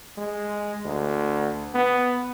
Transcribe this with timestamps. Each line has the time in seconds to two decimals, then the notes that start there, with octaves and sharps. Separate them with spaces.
0.18 G#3
0.84 D2
1.75 B3